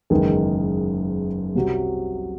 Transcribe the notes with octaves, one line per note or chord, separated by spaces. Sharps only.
F#1 E2 D#3 G#3 G#4
C2 C3 F#3